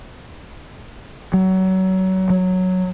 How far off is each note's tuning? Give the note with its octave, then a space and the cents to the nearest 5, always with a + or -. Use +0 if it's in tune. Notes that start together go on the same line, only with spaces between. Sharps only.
F#3 +25
F#3 -5